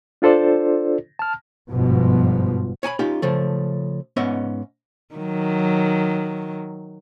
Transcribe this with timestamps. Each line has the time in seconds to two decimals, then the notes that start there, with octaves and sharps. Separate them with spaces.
0.22 D4 F4 A4 C5 D5
1.19 A5 F6
1.70 G1 G#2 B2 F3
2.83 C#5 G#5 A5 B5
2.99 C#4 D#4 F4 G4
3.22 C#3 F3 A3
4.16 G#2 B3 C#4 D#5 E5
5.15 D#3 F#3